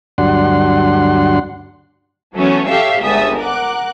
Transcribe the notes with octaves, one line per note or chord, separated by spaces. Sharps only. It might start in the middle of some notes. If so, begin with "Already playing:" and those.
D2 G2 F#3 D4 F#5 C6
E3 F#3 A3 B3 C#4
G4 A4 C#5 E5 F5
G1 C#2 E5 D#6 A6
A#4 F#5 D6 F#6